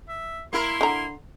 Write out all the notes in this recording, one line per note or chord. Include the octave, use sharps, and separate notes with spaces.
E5
A#3 E4 A#4 C6
D3 A#5